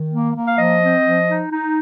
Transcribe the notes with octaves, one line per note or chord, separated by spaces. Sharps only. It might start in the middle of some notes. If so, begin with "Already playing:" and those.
Already playing: D#3
A#3
A#3
F5
F3 D#5
C4
F3
D#4
D#4